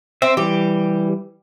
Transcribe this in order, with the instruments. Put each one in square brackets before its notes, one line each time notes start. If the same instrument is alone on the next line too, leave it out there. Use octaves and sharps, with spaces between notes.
[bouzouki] C4 [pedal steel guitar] E5
[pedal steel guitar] E3 G3 [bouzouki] G4